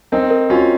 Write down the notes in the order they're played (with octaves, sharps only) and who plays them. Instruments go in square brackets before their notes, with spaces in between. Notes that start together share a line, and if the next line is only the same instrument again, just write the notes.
[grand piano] C4 D#4 [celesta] A#4
[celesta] A#4
[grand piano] C#4 F4 [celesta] F#4